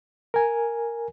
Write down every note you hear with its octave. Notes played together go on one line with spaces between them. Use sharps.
A#4 G#5